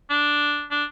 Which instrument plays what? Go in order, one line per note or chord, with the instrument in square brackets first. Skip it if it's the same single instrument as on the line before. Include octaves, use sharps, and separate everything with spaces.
[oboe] D4
D4